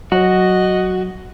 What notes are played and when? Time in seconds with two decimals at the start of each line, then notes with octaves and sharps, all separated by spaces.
0.12 F#3 F#4 D#5